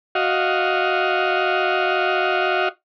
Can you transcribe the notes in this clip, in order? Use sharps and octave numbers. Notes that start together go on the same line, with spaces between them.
F#4 D#5 F5